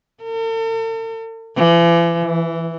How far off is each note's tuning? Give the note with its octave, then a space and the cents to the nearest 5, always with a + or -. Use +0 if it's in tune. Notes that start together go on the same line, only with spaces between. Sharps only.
A4 +45
E3 +40
E3 +0